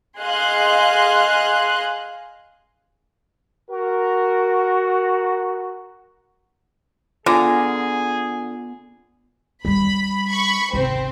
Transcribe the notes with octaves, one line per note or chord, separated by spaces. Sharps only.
G#4 D#5 F5 C6 F#6
F#4 A#4
D3 B3 F4 G#4 G#5 A#5
G3 C#4 B5
B5 C#6
G#1 C3 C4